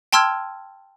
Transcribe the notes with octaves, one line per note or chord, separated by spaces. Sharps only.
G5 A5 C6 E6 F6 G#6